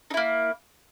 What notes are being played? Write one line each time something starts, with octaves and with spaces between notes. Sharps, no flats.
A#3 D#4 E4